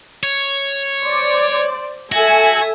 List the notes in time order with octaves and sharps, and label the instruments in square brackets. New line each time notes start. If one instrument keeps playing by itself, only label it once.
[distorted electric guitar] C#5
[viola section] C5 D5
[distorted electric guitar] F#4 [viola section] A4 E5 G#5